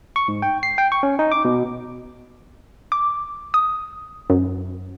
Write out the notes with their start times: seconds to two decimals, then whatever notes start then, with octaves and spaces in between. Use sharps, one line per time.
0.16 C#6
0.28 G#2
0.42 G5
0.63 C7
0.78 G5
0.92 C#6
1.03 C#4
1.19 D#4
1.32 D6
1.45 B2
2.92 D6
3.54 D#6
4.30 F#2